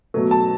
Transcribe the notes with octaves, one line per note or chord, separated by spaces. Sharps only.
B2 F#3 A3
A5